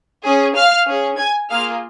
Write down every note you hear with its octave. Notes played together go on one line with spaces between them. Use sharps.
C#4 G#4
F5 F6
C#4 G#4
G#5 G#6
A#3 F4 G#4 F5 F6